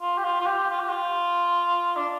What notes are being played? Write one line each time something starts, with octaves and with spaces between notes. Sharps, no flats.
F4
G4
F4
F4
G4
F4
G4
F4
D4